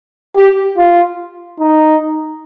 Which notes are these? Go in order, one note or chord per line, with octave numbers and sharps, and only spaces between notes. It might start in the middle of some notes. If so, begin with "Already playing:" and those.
G4
F4
D#4